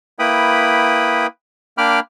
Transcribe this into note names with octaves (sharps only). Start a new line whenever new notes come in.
A#3 E4 B4 G5 B5 D#6
A#3 D4 G5 B5 D6 F6